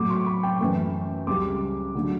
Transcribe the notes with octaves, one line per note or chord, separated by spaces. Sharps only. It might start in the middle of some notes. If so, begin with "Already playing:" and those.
Already playing: A2 F#3 A3 D6
C#6
B5
G5
F#2 E3 A3
C#2 C#3 G3 D6
D3 F#3 A3